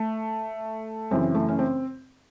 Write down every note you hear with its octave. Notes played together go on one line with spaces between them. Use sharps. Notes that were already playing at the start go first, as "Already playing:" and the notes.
Already playing: A3
F#2 C#3 E3 C4
A3
C#4
C4